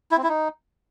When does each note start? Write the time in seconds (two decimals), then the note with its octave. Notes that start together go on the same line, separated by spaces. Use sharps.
0.11 E4
0.17 C4
0.23 E4
0.29 D#4